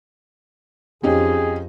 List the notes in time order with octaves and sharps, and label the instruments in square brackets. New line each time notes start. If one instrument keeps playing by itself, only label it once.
[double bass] F2 [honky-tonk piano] C4 C#4 D#4 [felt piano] G4 [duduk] G#4